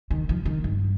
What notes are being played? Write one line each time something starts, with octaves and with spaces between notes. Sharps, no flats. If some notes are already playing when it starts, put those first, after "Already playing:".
D#3
F3
D#3
G2